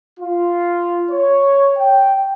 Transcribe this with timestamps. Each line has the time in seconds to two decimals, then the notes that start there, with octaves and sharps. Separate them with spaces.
0.20 F4
1.11 C#5
1.78 G5